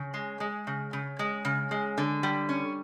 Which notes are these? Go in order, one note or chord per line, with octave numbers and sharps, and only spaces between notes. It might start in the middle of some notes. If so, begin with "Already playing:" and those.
Already playing: C#3
G#3
G#3
C#3
C#3
G#3
C#3
G#3
D3
G3
C#4